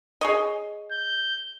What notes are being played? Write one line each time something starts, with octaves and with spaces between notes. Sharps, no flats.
G#4 C#5 D#5
G6